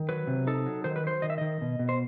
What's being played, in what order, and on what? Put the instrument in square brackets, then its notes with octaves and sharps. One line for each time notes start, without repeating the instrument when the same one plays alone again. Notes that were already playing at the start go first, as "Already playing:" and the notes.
Already playing: [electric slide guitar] D#3
F#3 B4
C3
D#4 A4
F#3
D#3 C5
B4
F#3 C5
D#3 D#5
E5
D#3 D#5
B2
B2
C5